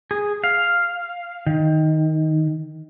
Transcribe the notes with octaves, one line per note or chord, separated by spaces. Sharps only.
G#4
F5
D#3